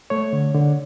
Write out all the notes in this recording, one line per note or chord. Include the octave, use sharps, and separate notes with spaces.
A3 C#5
D3
D3